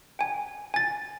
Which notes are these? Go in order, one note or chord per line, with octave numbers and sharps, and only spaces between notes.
G5 G#5
G#5 A6